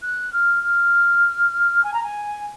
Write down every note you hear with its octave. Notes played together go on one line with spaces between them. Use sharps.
F#6
F6
F6
G#5
A#5
G#5